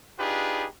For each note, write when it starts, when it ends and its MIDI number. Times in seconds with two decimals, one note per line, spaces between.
0.19 0.66 62
0.19 0.66 63
0.19 0.66 65
0.19 0.66 67
0.19 0.66 68
0.19 0.66 71